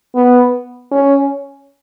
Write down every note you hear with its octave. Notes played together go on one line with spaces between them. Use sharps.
B3
C#4